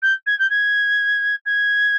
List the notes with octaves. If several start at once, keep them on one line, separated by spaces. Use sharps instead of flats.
G6
G#6
G6
G#6
G#6